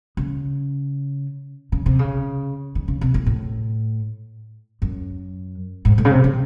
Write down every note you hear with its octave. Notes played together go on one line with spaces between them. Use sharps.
C#3
C#3
C3
C#3
D#3
C#3
C3
A2
A2
F#2
G#2
A2
C#3
C3
C#3